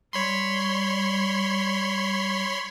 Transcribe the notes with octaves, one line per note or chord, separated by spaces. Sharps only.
G3 C#5 B5 C6